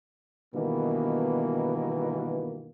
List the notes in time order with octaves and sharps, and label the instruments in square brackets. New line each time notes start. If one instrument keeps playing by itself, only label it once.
[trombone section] G2 B2 D#3 E3 A#3 B3